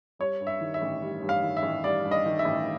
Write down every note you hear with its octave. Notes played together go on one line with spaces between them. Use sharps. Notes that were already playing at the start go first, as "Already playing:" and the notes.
G3 C#5
G2
E5
D#3
E5
A1
G3
G2
F5
D#3
E5
A1
G3 D5
G2
D#5
D#3
E5
A1